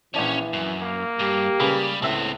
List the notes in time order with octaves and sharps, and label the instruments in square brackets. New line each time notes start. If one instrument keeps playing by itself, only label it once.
[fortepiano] A#1 D5 A5 [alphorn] E3 [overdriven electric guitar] C#4 C#5
[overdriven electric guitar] F#2
[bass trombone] A#3
[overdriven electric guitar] G2 [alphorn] G4
[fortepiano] C#3 B4 G#5 [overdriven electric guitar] G3
[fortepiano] C#2 E5 [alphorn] A2 [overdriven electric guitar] B3 C4